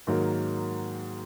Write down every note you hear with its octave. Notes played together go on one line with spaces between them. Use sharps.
G#2 D#3 F#3 A#3